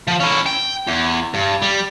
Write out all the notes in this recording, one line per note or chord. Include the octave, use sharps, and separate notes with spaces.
F3
C#4 E4
G5
E2
G2
G3